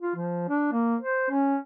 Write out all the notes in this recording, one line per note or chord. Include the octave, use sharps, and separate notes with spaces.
F4
F3
D4
A#3
C5
C#4